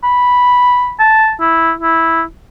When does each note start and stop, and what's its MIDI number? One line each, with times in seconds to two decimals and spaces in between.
0.04 0.94 83
0.99 1.33 81
1.40 1.73 64
1.81 2.23 64